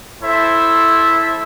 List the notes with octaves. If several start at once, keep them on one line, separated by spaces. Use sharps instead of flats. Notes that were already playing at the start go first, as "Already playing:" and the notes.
E4 A4 C5 E5